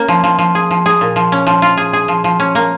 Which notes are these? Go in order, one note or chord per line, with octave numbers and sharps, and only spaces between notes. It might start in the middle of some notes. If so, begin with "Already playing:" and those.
Already playing: A#3 C#4
F3
F3
F3
G#4
F3
G#4
A#2
F3
C#4
F3
F4
G#4
G#4
F3
F3
C#4
A#3